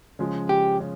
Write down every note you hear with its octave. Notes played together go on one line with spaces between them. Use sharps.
C#3 F3 G#3
G4
C#3